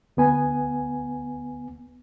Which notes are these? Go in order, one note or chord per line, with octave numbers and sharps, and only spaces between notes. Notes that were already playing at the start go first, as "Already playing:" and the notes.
D2 B3 G#5